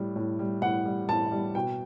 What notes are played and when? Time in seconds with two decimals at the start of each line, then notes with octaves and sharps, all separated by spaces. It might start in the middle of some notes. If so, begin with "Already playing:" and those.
Already playing: A2 G3
0.16 A2
0.39 G3
0.62 A2 F#5
0.86 G3
1.09 A2 A5
1.32 G3
1.55 B2 G5